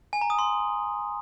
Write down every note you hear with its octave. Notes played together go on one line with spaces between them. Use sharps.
G#5
A#5
D#6
C6